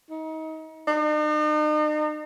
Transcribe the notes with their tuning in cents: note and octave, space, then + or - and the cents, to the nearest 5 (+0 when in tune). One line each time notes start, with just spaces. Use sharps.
D#4 +30
D#4 -45